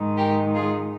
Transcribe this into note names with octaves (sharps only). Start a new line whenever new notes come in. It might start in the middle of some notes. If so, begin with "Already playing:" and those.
Already playing: G#2 D#3 G#3 D#4
G4 A#4
F4 G#4